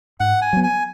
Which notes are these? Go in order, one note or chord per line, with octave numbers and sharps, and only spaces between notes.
G#2 F#5
G#5
F#3 B3
G#5